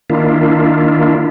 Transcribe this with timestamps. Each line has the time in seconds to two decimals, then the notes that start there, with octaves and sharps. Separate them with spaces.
0.10 D#3 A#3 D4 E4 F4